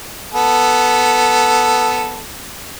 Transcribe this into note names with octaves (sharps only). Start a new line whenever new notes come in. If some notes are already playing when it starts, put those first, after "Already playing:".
B3 A4